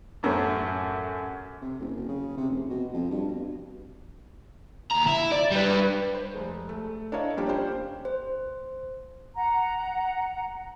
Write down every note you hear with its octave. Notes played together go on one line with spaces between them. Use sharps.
A1 F#2 A3 C#4
C3
F#1
F#1
C#3
C3
F1
B2
F2
G2
B2
D#2 A#5
E4
D5
G3 B4
C5
F1 G#3
A3
D4 E4 A#4 C#5 D#5 F5
F3 G3 A#3 C#4 D4 G4
C#4 D4 G4 C5
C5
F#5 A#5